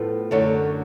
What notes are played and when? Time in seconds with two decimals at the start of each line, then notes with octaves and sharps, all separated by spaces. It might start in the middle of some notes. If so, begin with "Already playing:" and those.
Already playing: A2 F3 B3 A4
0.31 F#2 D3 F#3 A3